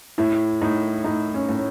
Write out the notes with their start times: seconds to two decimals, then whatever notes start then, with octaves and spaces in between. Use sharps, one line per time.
0.18 A2 E4
0.62 A2 D#4
1.04 A2 D#4
1.34 C#4
1.49 A2